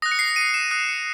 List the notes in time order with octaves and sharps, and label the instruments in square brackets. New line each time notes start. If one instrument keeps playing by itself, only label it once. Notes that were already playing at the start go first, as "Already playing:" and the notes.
[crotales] D#6 F#6 A#6
C#7
C7
D#7
E7
D#6 F#6 D#7
C#7